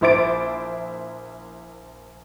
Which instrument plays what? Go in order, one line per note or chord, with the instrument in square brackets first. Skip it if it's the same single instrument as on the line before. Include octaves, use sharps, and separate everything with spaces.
[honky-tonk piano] A#1 E4 C5 D6 A6 D7